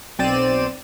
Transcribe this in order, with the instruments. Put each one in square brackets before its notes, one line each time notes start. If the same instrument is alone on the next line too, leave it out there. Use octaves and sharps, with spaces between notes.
[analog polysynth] B1 C4 D5 D#7 E7